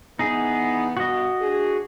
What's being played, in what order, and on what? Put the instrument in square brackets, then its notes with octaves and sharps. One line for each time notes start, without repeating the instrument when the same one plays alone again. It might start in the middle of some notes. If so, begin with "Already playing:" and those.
[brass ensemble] E3 B3 [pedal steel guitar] D#4 G#4
[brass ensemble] G2 B2 [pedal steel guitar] F#4 D#5
[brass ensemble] D4 G#4